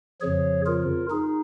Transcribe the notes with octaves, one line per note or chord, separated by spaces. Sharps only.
F2 C#3 F3 G#4 C#5
F4 A#4
D#4 G#4